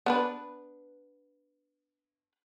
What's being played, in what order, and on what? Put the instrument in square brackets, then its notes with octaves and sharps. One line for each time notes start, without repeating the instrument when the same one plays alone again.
[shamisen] B3 D4 B4